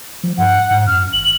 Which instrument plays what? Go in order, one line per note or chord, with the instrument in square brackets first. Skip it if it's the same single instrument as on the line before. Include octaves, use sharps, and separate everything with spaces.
[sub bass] F3
[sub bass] G2 [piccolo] F#5
[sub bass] G#2
[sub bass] F#2 [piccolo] F6
[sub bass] G#1 [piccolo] F#7